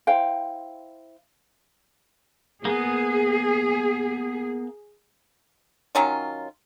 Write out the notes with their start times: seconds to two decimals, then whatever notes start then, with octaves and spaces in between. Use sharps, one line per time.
0.07 E4 C5 F5 G5
2.65 A#3 B3 G#4
5.95 D#3 F#3 C#4 F4